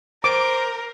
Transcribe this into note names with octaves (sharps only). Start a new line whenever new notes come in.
A#4 C5 D6